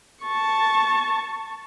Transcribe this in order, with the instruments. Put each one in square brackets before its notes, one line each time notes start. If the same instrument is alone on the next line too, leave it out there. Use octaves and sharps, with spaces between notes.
[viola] A5 C#6